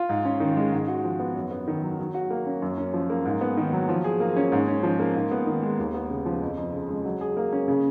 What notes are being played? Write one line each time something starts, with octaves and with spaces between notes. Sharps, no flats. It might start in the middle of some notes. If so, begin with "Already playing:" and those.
Already playing: F4
G#2
C#4
D#3
G#3
G#2
F#4
F3
B3
F#2
B3
D#3
F#3
F#3
F#4
A#3
C#4
F#2
C#4
F3
A#3
G#2
B3
D#3
F#3
F3
G#4
A#3
C#4
G#2
C#4
F3
A#3
G#2
B3
D#3
G#3
D#2
B3
C#3
F3
F2
F2
C#3
G#3
F#3
G#4
A#3
C#4
C#3